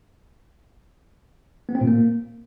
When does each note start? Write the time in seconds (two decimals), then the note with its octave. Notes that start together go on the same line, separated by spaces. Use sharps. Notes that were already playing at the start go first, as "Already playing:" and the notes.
1.69 B3
1.75 C4
1.81 A#2
1.87 A#3